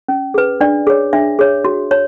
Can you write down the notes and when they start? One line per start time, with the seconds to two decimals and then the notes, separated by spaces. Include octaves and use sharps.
0.08 C#4
0.34 G#4 B4
0.61 D4 D5
0.87 G#4 C#5
1.13 D4 E5
1.39 G#4 C#5
1.65 F#4
1.91 C#5